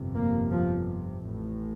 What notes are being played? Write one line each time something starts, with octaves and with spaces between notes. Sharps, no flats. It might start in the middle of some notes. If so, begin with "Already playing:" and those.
Already playing: G1 F2 C3
A#3
F3
A1 A2